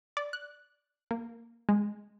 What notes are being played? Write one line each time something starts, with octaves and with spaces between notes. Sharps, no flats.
D5
F#6
A#3
G#3